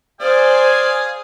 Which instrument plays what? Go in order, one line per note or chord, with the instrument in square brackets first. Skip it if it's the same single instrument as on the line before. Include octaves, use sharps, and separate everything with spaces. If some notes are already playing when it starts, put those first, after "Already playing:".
[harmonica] G#4 F5 G#5 [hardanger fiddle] C5 D5